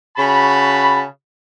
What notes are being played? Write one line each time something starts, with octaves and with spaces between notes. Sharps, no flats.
C#3 F#4 A5 B5